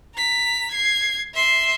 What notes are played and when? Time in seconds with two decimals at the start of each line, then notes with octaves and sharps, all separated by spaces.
0.15 A#5 B6
0.71 G#6 C7
1.34 E5 C6